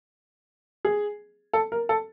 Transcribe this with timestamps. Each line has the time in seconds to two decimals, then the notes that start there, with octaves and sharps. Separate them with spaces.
0.85 G#4
1.53 A4
1.72 A#4
1.89 A4